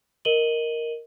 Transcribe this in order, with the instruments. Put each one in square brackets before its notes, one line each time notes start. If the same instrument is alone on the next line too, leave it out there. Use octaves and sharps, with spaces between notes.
[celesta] A#4 D#5 D#7 F#7 G7